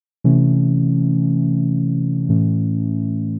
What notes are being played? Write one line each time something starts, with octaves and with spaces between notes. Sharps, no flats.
C3 E3 A3 C#4
A2 E3 A3 C#4